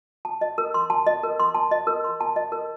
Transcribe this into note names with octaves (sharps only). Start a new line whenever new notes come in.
A5
D#5
A#4
C6
A5
D#5
A#4
C6
A5
D#5
A#4
C6
A5
D#5
A#4